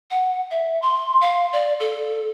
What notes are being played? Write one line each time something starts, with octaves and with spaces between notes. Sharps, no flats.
F#5
E5
C6
F5
D5
A4